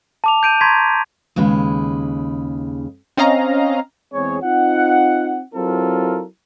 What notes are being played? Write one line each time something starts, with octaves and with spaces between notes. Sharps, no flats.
A5 D6 F7
G6 D7 D#7
A#5 C6 C#6 G#6 A#6 B6
D#2 C#3 G#3 B4
C4 C#4 D#5 F5 A#5
E2 G#3 C4 G#4 C#5
C4 D#4 F4 F#5
F#3 C4 E4 F4 A4 A#4